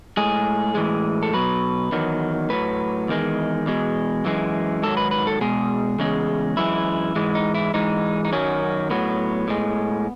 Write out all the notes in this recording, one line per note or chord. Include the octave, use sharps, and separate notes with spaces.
A2 G#3 G#4
A2 E3 G#3
A4
B2 F#3 B4
E2 D#3 F#3
A2 F#3 B4
E2 D#3 G#3
E2 B2 G#3
F#2 E3 G#3
G#2 D#3 F#3 A4
B4
B4
A4
B2 G#3 G#4
E2 C#3 G#3
F#2 E3 G#3 E4
G#2 E3 G#3
D#4
E4
G#2 E3 G#3 D#4
D#4
F#2 D#3 F#3 C#4
A2 F#3 B3
A2 G#3